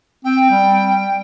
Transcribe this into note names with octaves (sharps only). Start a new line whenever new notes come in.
C4 G5
G3